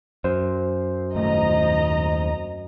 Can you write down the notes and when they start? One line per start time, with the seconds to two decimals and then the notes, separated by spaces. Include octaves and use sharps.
0.24 F#2 C5
1.15 D#1 D#2 A3 D#5 A#5